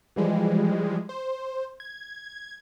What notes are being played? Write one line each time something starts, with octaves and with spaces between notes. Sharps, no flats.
E3 F3 G3 G#3
C5
G#6